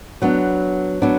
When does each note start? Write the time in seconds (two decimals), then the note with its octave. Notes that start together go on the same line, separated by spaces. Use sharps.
0.22 F#3 B3 D4
1.02 F#3 B3 D4